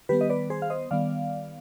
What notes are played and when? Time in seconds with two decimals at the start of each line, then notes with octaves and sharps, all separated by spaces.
0.09 D#3 G3 B3 G4 B4
0.21 D#5
0.29 B4 D5
0.50 G#4 C5
0.62 F5
0.70 C5 D#5
0.91 D#3 G3 B3 D5 F5